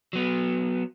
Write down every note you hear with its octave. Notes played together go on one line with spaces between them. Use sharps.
F#3 B3